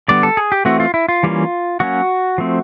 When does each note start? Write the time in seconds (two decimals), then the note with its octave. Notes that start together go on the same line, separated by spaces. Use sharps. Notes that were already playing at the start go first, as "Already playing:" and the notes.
0.08 D3 G3 B3 D5
0.23 A4
0.37 G#4
0.52 G4
0.65 E3 A3 C4 F#4
0.80 F4
0.94 E4
1.09 F4
1.23 E3 G3 A#3 C#4
1.80 F#3 A#3 C#4 F#4
2.38 F3 A3 C4